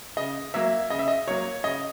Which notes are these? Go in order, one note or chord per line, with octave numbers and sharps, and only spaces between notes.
C#3 D#5
F#3 A#3 E5
C#3 D#5
E5
D#5
F#3 A#3 C#5
C#3 D#5